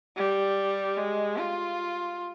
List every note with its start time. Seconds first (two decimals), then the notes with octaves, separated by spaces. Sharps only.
0.16 G3
0.97 G#3
1.38 F4